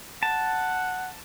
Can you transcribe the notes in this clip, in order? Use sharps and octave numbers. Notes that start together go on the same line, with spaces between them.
F#5 A5